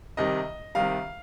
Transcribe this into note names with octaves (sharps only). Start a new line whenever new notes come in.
C2 C3 D#3 G3 D#5
C2 C3 D#3 G3 F5